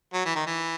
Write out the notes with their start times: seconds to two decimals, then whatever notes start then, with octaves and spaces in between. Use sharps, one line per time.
0.13 F#3
0.25 E3
0.35 D#3
0.46 E3